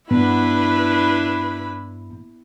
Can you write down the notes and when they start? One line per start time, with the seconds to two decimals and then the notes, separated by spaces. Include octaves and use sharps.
0.11 G2 B3 D4 E4 B4 B5